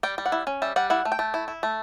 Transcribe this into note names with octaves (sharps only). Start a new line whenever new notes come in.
G3 G5
G3
F#5
E4
C#4
G3 E5
G3 F#5
E4 F#5
A3
G5
A3
E4
E4
A3